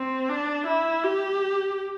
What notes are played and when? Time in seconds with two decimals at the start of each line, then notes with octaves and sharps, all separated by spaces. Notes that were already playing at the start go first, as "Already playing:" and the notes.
Already playing: C4
0.29 D4
0.66 E4
1.04 G4